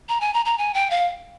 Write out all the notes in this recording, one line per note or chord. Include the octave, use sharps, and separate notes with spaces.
A#5
G#5
A#5
A#5
G#5
G5
F5